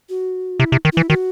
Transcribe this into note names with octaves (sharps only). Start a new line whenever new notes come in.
F#4
C3 E4
C3
D#3
E3 E4
D#3 F#4